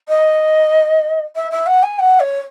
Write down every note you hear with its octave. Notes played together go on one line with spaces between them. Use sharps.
D#5
E5
E5
F#5
G#5
F#5
C#5